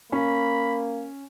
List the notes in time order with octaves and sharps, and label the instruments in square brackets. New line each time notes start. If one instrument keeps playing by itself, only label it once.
[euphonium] A#3 [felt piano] C#4 [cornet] B5